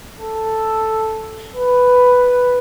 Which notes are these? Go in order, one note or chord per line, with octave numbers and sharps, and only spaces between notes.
A4
B4